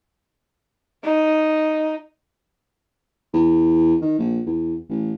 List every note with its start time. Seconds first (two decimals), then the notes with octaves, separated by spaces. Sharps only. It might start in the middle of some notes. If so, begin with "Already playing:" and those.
1.05 D#4
3.33 E2
4.02 D#3
4.19 A#1
4.46 E2
4.90 A1